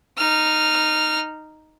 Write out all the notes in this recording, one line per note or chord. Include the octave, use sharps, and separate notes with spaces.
D#4 F6